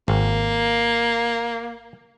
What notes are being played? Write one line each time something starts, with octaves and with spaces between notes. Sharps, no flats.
G#1 A#3